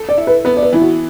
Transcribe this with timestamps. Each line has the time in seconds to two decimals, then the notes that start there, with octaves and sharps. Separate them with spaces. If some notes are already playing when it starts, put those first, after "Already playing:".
Already playing: A4
0.09 D5
0.18 E4
0.27 B4
0.45 B3 B4
0.57 D5
0.63 B4
0.73 E3 E4
0.81 F#4